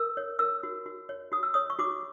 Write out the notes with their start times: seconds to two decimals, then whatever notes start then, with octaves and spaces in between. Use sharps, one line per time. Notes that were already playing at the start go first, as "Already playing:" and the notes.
Already playing: A#4 E6
0.17 C#5
0.39 A#4 E6
0.63 F#4
0.86 F#4
1.09 C#5
1.32 F#4 D#6
1.43 E6
1.54 C#5 D#6
1.70 C#6
1.79 F#4 D6